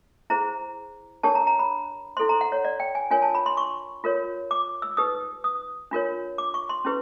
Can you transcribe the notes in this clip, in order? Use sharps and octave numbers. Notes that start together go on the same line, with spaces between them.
E4 G#4 C5 A#5
D4 G4 A#4 C#5 A5
A#5
A#5
B5
E4 A4 C5 C6
A#5
F#5
C#5
D5
G5
G#5
D4 F4 A#4 C#5 G#5
A5
B5
C6
C#6
F4 A#4 C#5
D6
E6
D#4 G4 B4 D#6
D#6
D4 F4 A#4 C#5
D6
C#6
C6
C#4 E4 G4 B4